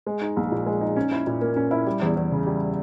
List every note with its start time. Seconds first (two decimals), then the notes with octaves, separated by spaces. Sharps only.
0.06 G#3
0.22 D#4
0.37 A#1
0.52 A#2
0.66 G#3
0.81 D#4
0.96 C#4
1.12 E4
1.27 A#2
1.41 A#3
1.56 C#4
1.71 E4
1.86 G3
2.02 E2
2.16 E2
2.31 C#3
2.46 G3